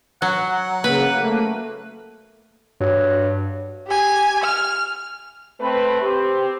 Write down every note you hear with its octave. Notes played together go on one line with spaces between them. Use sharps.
F#3 F#5
C#3 A#3 B4
A3
G2 F#3
G4 G#5
F6
A3 C4 B4
C4 G4